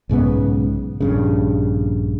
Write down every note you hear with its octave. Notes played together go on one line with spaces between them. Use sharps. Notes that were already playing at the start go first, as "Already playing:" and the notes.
B1 G#2 C#3 B3
A#1 G2 C#3